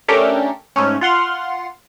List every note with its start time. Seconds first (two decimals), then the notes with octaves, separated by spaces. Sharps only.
0.08 A3 C#4 D4 G4 A4 A#4
0.76 G#2 A3 C#4
1.01 F4 F#5 C6 F6